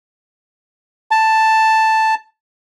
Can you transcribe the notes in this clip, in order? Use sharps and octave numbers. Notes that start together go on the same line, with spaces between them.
A5